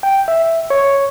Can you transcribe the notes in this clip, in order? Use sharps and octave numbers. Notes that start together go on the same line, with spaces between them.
G5
E5
C#5